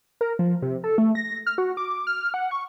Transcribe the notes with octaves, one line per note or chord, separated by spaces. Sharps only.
A#4
F3
C3
A4
A3
A#6
F6
F#4
D6
F6
F#5
C#6